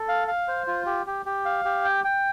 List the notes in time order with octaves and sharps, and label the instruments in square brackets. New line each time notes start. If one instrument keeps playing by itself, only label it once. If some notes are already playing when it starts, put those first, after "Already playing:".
Already playing: [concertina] A4
F5
F5
C5
F4
G4
G4
G4
F5
G4
G5
G5